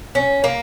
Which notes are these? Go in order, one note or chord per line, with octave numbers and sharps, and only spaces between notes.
C#4
A#3